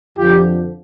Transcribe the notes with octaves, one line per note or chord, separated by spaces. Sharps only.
F2 D3 F3 F4 G4